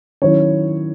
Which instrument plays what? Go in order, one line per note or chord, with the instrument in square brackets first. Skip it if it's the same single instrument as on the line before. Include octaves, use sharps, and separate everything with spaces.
[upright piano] D#3 F#3 C#4 E4 C#5